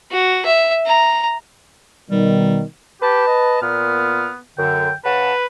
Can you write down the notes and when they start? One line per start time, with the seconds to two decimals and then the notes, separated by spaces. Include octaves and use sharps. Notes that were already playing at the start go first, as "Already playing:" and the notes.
0.12 F#4
0.45 E5
0.86 A#5
2.11 B2 D#3 G3
3.02 G4 B4 A5
3.27 D#5
3.62 A#2 B3 F6
4.58 F#2 D3 G5
5.05 C#3 B4 F#5 A5